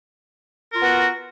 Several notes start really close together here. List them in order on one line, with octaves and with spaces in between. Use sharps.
A#4 F4 B3 F#4